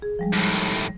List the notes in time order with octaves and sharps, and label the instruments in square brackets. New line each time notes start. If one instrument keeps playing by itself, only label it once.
[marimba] G#4
F3 G3 G#3
[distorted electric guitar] D#2 A2